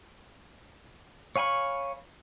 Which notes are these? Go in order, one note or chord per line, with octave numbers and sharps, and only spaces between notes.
C#5 F5 G#5 B5 C#6